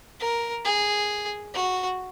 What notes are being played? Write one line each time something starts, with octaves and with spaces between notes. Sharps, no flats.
A#4
G#4
F#4